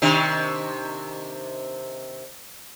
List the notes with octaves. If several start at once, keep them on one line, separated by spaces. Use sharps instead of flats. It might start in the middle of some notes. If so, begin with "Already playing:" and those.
C3 D#3 D4